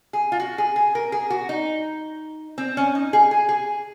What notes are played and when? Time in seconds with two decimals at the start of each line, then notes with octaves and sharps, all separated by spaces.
0.13 G#4
0.32 F4
0.40 F#4
0.58 G#4
0.76 G#4
0.95 A#4
1.12 G#4
1.30 F#4
1.49 D#4
2.58 C4
2.77 C#4
2.95 D#4
3.13 G#4
3.31 G#4
3.49 G#4